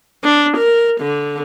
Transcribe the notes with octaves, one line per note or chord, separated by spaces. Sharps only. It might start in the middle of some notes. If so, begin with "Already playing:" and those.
D4
A#4
D3